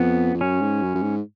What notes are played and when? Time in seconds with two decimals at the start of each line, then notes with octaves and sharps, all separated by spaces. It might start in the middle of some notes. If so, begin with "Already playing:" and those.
Already playing: F2 B3
0.34 F2
0.41 F#2 C#4
0.62 G#2
0.83 F#2
0.95 F#2
1.02 G#2